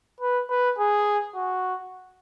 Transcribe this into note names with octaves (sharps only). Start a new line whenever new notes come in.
B4
B4
G#4
F#4